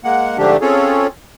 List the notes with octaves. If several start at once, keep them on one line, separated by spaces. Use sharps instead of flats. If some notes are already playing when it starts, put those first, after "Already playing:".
G#3 A#3 F#5
G#2 D3 F3 A3 D4 G4
C4 C#4 F4 G#4 A4 C#5